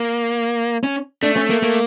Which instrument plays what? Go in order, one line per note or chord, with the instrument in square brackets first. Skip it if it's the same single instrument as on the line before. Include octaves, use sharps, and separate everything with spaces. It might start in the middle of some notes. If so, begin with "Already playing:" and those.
Already playing: [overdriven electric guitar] A#3
[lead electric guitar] C#4
[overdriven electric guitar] A3 [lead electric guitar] D4
[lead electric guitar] C#4
A#3
A#3